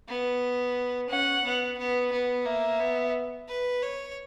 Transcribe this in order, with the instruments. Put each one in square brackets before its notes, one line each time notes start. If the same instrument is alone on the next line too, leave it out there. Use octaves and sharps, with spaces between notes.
[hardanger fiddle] B3
[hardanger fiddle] C#4 [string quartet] F#5
[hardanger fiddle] B3
B3
B3
[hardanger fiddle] A#3 [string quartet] E5
[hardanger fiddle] B3
B4
C#5